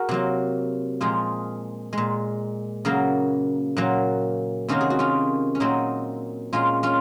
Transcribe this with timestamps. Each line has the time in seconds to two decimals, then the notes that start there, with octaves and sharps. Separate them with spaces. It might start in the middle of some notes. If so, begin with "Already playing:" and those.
Already playing: F#4 G#4 A#4
0.09 C3 F#3 A#3
1.01 A#2 F3 G#3 F4 G#4
1.93 A#2 G#3
2.85 C#3 F#3 A#3
3.77 A#2 F#3 A#3
4.68 C3 D#3 F#3 A#3 C#4 F4
4.81 G#4
4.90 F#4
4.99 C#4 F4
5.55 C#4
5.60 A#2 F#3 A#3 C4 D#4
6.53 A#2 G#3 C#4 F4
6.83 C#4 F4